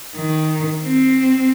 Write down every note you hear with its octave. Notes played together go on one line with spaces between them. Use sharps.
D#3
C4